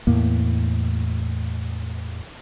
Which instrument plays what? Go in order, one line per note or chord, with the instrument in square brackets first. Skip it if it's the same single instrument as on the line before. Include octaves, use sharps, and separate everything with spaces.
[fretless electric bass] E2 A2 A#3